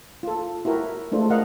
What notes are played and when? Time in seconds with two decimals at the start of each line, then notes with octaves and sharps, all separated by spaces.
0.23 F4 A4
0.65 E4 F#4 G4 A#4
1.12 G#3 A3 D4 F4 C5
1.30 A#4 D#5 F5 F#5